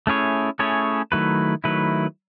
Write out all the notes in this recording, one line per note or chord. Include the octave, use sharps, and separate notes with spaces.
A3 C#4 E4 G#4 C#5
A3 C#4 E4 G#4 C#5
D#3 F#3 A3 E4 B4
D#3 F#3 A3 E4 B4